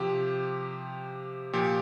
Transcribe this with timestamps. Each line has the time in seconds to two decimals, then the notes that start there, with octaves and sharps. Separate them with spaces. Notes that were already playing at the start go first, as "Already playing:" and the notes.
Already playing: C3 F3 G4
1.53 A#2 F3 G4